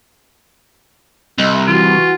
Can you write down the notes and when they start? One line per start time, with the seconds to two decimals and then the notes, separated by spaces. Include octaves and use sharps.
1.38 C2 D#5 E6
1.54 E5 A#5
1.67 E3 F4 F#4